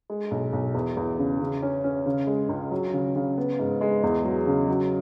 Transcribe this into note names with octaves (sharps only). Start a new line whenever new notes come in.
G#3
B1
B1
E2
E2
C#3
C#3
C#4
C#4
C#3
G#3
C#2
F#3
C#3
C#3
B3
G#2
G#3
E2
F#3
C#3
F#3